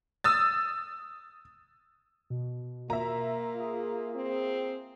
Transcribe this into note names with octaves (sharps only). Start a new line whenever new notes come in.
D#6 E6 A6
B2
A#3 F4 E5 A#5
G#4
C4